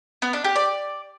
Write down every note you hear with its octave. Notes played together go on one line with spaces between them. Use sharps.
B3
D4
G4
D5